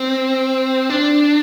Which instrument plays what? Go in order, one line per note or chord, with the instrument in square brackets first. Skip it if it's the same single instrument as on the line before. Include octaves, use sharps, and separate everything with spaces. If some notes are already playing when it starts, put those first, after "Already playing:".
Already playing: [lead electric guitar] C4
D4